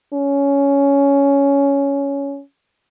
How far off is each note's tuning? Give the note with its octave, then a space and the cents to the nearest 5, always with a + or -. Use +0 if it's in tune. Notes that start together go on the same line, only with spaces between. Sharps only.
C#4 +10